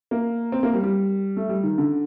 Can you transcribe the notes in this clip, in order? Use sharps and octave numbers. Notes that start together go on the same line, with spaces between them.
A#3
C4
A#3
G3
G3
A3
G3
D#3
D3